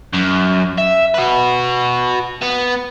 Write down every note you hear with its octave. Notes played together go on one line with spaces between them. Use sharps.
F#2
E5
F#4 B4
B3